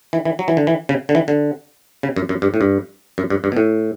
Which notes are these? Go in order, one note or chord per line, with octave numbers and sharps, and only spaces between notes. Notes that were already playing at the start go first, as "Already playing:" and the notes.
E3
E3
F#3
E3
D3
E3
C#3
D3
E3
D3
C#3
F#2
F#2
G2
A2
G2
F#2
G2
G2
B2
A2